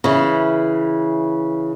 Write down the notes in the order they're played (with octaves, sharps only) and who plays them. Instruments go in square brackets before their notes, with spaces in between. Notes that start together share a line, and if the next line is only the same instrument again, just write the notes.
[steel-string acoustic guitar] C#3 E3